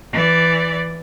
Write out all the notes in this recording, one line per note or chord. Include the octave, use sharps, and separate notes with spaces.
E3 D5